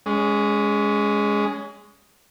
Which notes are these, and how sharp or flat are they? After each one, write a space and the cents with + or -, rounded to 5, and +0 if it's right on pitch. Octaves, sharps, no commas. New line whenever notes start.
G#3 +0 C#4 +30